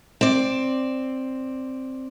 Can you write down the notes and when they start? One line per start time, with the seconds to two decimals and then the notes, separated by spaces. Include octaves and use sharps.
0.21 C4 D5